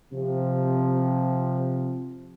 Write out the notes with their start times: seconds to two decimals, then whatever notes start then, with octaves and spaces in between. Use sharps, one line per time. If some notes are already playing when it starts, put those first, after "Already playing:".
0.12 C3 F3